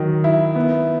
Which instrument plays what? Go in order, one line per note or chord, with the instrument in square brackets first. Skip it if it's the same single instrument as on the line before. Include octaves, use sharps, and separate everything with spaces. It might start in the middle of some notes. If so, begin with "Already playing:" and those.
Already playing: [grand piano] D#3 F#3
E4
B3